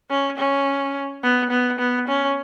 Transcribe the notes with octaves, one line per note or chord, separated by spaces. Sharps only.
C#4
C#4
B3
B3
B3
C#4